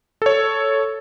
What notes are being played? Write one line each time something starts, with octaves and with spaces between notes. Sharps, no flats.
A4 C#5